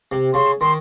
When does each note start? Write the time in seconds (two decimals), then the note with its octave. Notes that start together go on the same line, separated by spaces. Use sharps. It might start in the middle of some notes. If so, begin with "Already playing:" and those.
0.12 C3
0.34 C#3 C6
0.61 D#3 C6